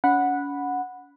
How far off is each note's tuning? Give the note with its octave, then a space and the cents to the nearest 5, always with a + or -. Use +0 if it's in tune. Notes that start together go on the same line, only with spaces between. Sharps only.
C#4 +40 F#5 -10 B5 +0